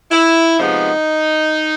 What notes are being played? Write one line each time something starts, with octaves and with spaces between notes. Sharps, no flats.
E4
C3 F3 G#3 B3 D#4